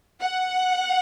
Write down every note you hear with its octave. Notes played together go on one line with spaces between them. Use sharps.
F#5